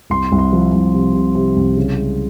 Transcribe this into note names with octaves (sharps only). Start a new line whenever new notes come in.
C2 C6
C2
C6
F3
C2
C3
C3
C3
C2
C#3
G#3